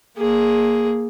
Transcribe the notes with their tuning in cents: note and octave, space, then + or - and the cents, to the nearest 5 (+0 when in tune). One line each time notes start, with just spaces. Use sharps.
A#3 +0 G#4 +0